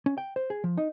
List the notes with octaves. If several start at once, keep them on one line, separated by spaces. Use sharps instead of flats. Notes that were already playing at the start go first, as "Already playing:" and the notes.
C#4
G5
C5
G#4
F3
D#4